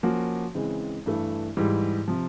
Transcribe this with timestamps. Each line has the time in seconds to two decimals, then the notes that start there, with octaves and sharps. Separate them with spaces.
0.03 F3 A#3 C#4 F#4
0.55 C#3 E3 G#3 C4
1.06 G2 E3 A3
1.57 G#2 E3 G3
2.08 C3 F3